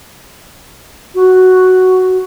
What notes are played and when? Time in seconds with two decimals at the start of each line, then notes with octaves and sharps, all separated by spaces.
1.15 F#4